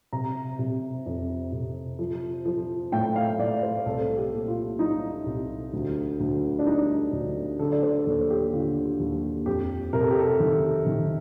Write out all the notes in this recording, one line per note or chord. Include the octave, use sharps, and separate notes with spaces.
C3 A#5
C3
F2
C3
F3
F3
A2 G5
F5
A2 D5
C5
C2 A4
G4
A#2
F4
G3 D#4
C2
D2
D2
D4
G3 D#4
D2
D3 A4
D5
C5
D#2 A4
G4
D3 F4
D#2
F2 G4
C3 A#4
A4
G4
A4
D#3
D#3